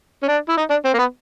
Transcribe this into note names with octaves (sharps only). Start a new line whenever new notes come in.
C#4
D4
E4
D#4
D4
C4
A#3
B3